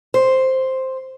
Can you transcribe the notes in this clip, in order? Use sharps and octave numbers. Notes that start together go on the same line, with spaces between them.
C5